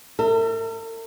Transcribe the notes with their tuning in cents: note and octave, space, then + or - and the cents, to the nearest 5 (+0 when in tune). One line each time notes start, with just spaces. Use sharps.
A#4 -45 E5 -10